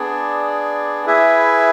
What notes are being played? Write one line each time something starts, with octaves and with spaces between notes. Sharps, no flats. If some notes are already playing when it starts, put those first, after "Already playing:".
Already playing: B3 D4 G#4 D5
E4 G#4 B4 E5